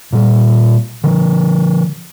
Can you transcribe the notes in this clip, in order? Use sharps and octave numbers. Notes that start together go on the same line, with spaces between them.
A#2 G3
D3 F3